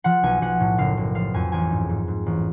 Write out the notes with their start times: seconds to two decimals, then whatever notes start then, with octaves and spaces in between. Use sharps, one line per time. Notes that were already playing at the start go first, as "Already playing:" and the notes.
0.04 F3 F#5
0.23 B1 G#5
0.42 B1 F#5
0.60 A2
0.78 F#1 F5
0.97 F#1
1.15 F3 F5
1.34 F2 G#5
1.52 A1 G#5
1.71 G#2
1.90 G#2
2.08 G#2
2.26 A1